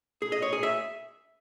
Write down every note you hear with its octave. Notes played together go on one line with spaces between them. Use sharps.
G#4
D#5
C#5
G#4
E5